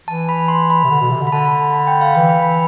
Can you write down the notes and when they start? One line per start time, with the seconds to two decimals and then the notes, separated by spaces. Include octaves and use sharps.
0.08 E3 A5
0.29 B5
0.48 C6
0.70 B5
0.84 C3
0.90 D3
1.01 B2
1.11 C3
1.22 D3
1.27 B5
1.32 D3 A5
1.46 B5
1.74 B5
1.87 G5
2.01 F5
2.15 E3 G5
2.29 B5
2.43 B5